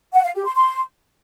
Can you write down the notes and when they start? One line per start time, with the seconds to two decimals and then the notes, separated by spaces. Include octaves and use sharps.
0.13 F#5
0.24 F5
0.35 G4
0.45 C6
0.56 C6